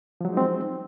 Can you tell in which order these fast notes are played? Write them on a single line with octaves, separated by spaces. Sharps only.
F3 F#3 G#3 D#4 C4